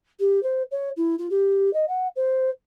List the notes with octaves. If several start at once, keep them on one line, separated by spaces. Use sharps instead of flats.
G4
C5
C#5
E4
F4
G4
D#5
F#5
C5